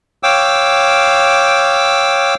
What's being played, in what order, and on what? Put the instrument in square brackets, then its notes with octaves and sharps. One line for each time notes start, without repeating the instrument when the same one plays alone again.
[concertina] C#5 F5 G5 D6 E6